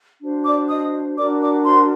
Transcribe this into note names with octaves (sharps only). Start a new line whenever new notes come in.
D4 F#4 C5
D5 D6
D#5 D#6
D4 F#4 A#4 D5 D6
D5 D6
C5 C6